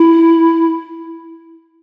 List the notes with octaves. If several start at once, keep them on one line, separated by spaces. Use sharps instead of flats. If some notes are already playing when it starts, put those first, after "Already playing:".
Already playing: E4